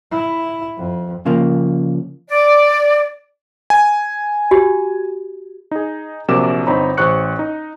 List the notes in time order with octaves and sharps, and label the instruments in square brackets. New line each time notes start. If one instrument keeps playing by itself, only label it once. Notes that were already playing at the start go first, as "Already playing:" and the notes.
[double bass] E4
F2
[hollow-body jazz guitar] C#3 F3 A#3
[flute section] D5
[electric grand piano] G#5
[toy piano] F#4 G4
[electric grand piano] D#4 G#4
A#1 C3 F#3 A#4 D6 E7
G1 C4 D#4 C#5 A#5 B5
A1 G4 C5 C#6 F#6 C#7
D#4